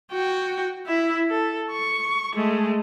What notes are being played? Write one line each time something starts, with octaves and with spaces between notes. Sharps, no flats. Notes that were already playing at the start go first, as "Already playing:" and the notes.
F#4 G5
E4 E5
A4
C#6
G#3 A3